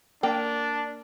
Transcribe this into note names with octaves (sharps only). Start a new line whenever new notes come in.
A#3 D4 G5